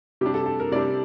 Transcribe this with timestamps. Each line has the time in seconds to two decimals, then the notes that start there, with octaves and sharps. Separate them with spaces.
0.21 C3 G3 D4 G4
0.34 A4
0.46 A4
0.60 A#4
0.72 C3 G3 D4 D5